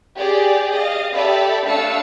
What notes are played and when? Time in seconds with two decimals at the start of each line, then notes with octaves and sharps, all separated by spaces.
0.16 G4 G#4 D5
0.73 D#5 F5
1.15 G4 A4 D5 E5 B5
1.66 A3 D4 F5 E6 C#7